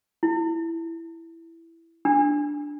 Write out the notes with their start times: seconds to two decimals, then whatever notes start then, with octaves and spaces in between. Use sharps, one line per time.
0.23 E4
2.05 D4